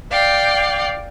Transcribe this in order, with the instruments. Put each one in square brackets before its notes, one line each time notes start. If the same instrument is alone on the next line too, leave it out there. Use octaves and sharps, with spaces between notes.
[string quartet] D5 F5 G5